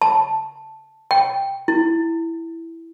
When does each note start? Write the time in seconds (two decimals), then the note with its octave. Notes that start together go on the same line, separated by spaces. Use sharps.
0.02 A5
1.11 G5
1.68 E4